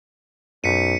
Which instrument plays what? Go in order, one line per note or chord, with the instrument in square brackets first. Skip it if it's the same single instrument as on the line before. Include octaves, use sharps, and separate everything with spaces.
[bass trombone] B1 [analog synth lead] F#2 [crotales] B6 C#7 D#7